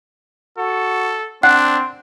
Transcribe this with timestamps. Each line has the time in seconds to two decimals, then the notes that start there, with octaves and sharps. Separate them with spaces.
0.58 F#4 A4
1.43 C4 D4 F#5 F#6